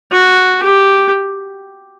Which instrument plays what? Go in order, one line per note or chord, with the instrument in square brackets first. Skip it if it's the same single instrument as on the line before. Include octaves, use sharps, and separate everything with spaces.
[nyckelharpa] F#4
G4